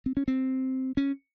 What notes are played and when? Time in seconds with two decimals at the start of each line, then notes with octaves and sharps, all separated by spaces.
0.06 C4
0.17 C#4
0.28 C4
0.97 C#4